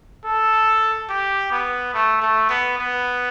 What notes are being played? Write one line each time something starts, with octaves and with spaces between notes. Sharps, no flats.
A4
G4
B3
A3
A3
B3
B3